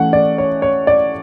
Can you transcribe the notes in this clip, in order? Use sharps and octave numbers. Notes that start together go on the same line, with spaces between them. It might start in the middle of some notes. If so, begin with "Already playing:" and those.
Already playing: E3 A3 C#4 F#5
D5
C#5
C#5
D5